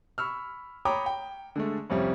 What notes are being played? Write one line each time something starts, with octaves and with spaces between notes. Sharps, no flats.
B5 C#6 E6 F6
C#5 G5 A#5 B5 D6 D#6
G5
D3 G#3 A3
C2 F2 G3 C#4